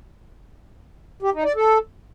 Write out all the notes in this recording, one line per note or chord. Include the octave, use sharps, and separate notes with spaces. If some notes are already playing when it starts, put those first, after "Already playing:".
G4
D#4
D5
A4